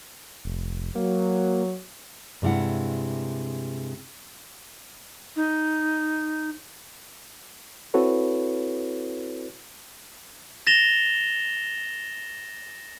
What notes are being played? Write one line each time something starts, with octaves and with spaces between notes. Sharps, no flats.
F1
F#3 A#3
G2 C3 G#3 E4 F#5
D#4
C4 E4 F#4 A4 B4 C#5
A6 A#6 E7 F7 G7